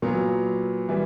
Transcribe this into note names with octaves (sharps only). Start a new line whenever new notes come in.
A#2 F#3 B3
E3 G3